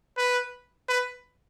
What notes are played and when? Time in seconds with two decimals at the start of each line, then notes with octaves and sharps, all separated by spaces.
0.18 B4
0.89 B4